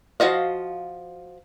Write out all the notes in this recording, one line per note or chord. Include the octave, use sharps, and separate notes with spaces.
F3 F#4 D#5 F5